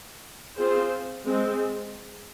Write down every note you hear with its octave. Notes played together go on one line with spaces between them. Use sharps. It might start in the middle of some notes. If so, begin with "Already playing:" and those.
C4 F4 G#4 C5
G#3 C4